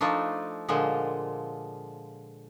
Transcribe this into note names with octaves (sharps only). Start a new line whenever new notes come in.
F3 A3 D4 D#4
A#2 D3 F3 G#3